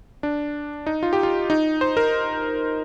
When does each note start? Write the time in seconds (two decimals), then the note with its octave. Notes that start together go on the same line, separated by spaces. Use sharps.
0.23 D4
0.86 D#4
1.03 F4
1.13 G4
1.23 F4
1.50 D#4
1.81 C5
1.97 A#4